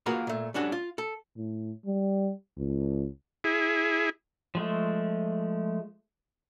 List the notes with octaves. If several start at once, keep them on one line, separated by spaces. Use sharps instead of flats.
A#3 F4 F#4 G#4 A#4 B4
A#2 A3
G3 C#4 D4 F#4 A4
F4
A4
A2
G3
C#2
E4 G#4
F3 G#3 A3